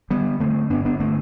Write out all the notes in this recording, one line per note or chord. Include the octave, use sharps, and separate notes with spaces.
D3 G3 B3
D3 A3 C4
G2 B3 D4
B3 D4
D3 A3 C4